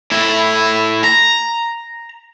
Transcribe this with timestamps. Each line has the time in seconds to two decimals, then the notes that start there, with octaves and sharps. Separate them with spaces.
0.12 A2 E4
1.04 A#5